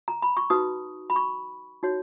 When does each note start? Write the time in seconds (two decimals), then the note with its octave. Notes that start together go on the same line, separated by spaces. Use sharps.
0.08 A#5
0.22 B5
0.37 C#6
0.50 D#4 F#4 B4 D#6
1.10 B5
1.16 C#6
1.83 D#4 F#4 C#5